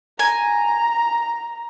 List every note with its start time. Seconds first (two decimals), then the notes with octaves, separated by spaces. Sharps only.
0.19 G#5 A#5